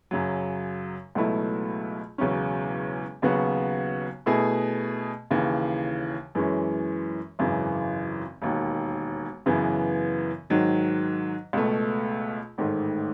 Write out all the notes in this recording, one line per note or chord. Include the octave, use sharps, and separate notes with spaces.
F#2 C#3 F#3
C#2 B2 F#3 A3 E4
E1 E2 C#3 F#3 C#4
D#2 C#3 F#3 B3 F#4
B2 A3 E4 G#4
D#2 C#3 E3
F#2 E3 G#3 C#4
G#1 F#2 C#3 E3
E1 D#2 D#3
F#2 C#3 E3 B3
G#2 D#3 F#3
C#2 B2 A3
A1 G#2 D#3 A3